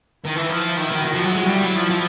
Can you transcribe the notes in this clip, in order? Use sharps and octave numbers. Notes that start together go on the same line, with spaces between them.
D#3 E4
E3
F3
D#3 F#4
D#3
D#3
F3
F#3
G#3 E4
G3
F#3
F3
F3